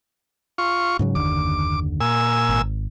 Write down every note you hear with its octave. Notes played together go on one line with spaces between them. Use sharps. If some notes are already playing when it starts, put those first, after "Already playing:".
F4 C#6
G#2 C#3 F#3
F#1 D#2 D3 D6
A#2 G#5 E6
G#1